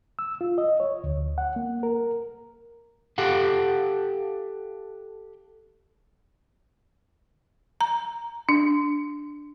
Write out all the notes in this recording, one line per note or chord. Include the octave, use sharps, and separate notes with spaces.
E6
F4
D#5
C#5
D2
F#5
A#3
A#4
G4 A4 F5 F#5
A#5
D4